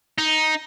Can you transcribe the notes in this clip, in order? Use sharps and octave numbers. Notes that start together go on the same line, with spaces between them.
D#4